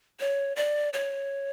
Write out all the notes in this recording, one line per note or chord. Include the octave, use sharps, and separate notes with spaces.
C#5
D5
C#5